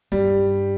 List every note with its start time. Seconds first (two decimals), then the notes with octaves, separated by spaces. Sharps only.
0.12 G2 G3